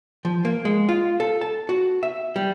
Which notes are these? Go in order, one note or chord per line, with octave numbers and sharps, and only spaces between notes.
F3
A#3
G#3
F4
A4
A5
F#4
E5
G3